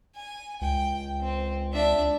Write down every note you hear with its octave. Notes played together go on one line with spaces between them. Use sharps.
G#5
C#2 G5
C4
D4 E5